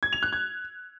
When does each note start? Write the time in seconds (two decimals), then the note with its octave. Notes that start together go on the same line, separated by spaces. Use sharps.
0.03 G#6
0.13 F7
0.23 F#6
0.33 G#6